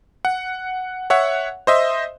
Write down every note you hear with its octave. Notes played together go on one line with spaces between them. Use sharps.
F#5
C#5 E5 F#5
C5 D#5 E5